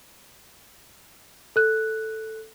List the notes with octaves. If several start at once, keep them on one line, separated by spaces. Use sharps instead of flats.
A4 F#6